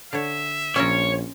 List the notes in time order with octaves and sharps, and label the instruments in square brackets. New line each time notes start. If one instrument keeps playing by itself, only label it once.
[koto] D3 C#5 [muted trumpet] E5
[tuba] A#1 [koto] C#4 F4 A#4 [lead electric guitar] C#5